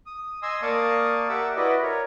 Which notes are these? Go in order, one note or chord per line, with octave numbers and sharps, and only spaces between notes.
D#6
D#5 G#5 C6 D#6 E6
A#3 D5 F5 A5 C#6 D#6
G4 A#4 E5 F#5 D6 E6
E4 F#4 B4 D5 D#5
A#4 C#5